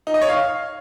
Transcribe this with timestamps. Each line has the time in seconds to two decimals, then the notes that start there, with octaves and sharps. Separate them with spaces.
0.07 D#4
0.14 D#5
0.22 C#5
0.29 F5